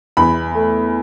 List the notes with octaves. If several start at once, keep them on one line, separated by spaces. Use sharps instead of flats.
E2 B5
A3